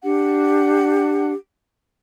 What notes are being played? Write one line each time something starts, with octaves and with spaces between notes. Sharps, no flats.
D4 G4 F#5